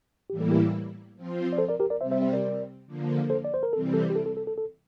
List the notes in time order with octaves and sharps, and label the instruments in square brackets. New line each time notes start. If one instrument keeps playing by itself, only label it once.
[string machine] A2 E3 G3 A#3 E4 [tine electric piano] G4
[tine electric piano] A4
G4 A#4
[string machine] F3 C4 F4
[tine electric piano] D5
A4 C5
A#4 D5
G4 A#4
A#4 D5
[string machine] C3 G3 C4 [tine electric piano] C5 E5
[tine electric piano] C5 E5
C5 E5
A#4 D5
[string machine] D3 F3 A#3
[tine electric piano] A4 C5
D5
C5
A#4
[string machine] C3 E3 G3 C4 [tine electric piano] A4
[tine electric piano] A4
G4
A4
A4
A4
A4
A4